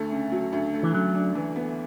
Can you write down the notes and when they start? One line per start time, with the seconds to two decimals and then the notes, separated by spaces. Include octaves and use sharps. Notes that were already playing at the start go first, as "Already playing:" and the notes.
Already playing: D2 A3
0.12 C#3
0.32 F#3
0.53 D2
0.74 A3
0.83 E3
0.94 C#3 F#3
1.15 D4
1.35 E3
1.56 B3